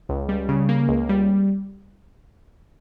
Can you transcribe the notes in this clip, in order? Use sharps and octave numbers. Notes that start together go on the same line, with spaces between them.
C#2
G3
C#3
A#3
C#2
G3